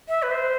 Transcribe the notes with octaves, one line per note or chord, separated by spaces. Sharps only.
E5
B4
C5